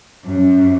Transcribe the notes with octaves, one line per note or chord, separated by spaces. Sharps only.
F#2